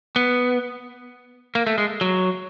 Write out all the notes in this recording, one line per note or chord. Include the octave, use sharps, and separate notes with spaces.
B3
A#3
A3
G#3
F#3